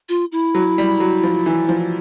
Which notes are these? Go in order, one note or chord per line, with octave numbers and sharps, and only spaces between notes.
F4
E4
F#3
G3
F#3
F3
E3
F3